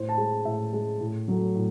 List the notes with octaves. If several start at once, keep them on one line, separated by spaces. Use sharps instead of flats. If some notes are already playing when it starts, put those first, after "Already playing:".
Already playing: A2 C5
A5
G#3
A2 E5
G#3
A2
F#3 A3
A2